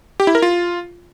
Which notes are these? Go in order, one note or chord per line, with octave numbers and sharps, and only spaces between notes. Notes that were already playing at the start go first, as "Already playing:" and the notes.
G4
E4
A#4
F4